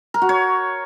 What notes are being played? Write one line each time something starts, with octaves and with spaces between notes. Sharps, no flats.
A#4
F#4
C#5